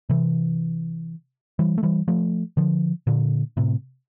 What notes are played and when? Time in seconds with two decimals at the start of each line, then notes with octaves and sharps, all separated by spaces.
0.09 C3 E3
1.59 E3 G3
1.78 A3
1.83 E3 G3
2.08 F3 A3
2.57 D3 F3
3.07 A#2 D3
3.57 A2 C3